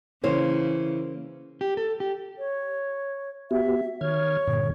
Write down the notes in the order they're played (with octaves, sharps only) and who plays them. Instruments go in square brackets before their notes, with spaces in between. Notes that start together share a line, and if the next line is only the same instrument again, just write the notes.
[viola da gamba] C#3 [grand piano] E3 [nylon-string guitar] A#3 C5 C#5
[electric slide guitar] G4
A4
G4
[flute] C#5
[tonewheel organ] B3 F#4 G4 [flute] E5
[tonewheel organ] D#3 F6 G#6 [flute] C#5
[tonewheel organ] G2 A#2 D3